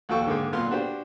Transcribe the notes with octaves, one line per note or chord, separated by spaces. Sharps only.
A#1 D#2 F#4 A4 G5 C#6
G#2 D3 A#3 G#4 G5
B1 A#2 B3 F4 C6
D4 F#4 G4 C5